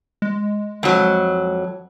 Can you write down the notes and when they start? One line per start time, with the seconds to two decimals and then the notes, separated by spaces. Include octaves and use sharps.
0.22 G#3
0.83 F2 F#3